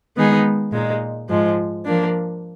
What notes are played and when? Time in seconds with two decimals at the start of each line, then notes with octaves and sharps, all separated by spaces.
0.16 D#3 G#3 B3 D#4 G#4
0.72 A#2 G#3 D#4
1.29 G#2 F3 G#3
1.85 F3 A#3 D4